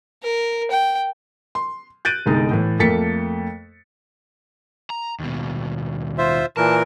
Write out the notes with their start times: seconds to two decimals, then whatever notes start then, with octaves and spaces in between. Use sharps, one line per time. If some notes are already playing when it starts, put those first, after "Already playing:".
0.23 A#4
0.71 G5
1.55 C6
2.05 F#6 G6 A6 D7 D#7
2.26 G1 C2 G#3 D#4
2.51 A2 E3
2.79 F2 A3 A#3 A6 B6 C#7
4.90 A#5
5.19 D#2 B2
6.18 F4 C5 E5
6.57 A#2 E3 A#4 A5